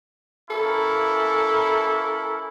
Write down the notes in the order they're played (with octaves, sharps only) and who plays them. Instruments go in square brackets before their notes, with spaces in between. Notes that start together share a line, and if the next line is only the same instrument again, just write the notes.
[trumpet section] A#3 C#4 E4 [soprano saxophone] A4